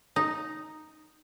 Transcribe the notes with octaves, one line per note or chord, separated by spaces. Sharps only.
D#4